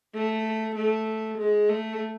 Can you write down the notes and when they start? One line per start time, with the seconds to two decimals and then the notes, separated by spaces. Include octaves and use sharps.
0.14 A3
0.75 A3
1.38 G#3
1.69 A3